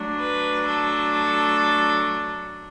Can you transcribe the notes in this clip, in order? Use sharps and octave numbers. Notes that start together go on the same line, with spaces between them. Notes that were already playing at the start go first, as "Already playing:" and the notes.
Already playing: F#3 A3 D4
B4
A4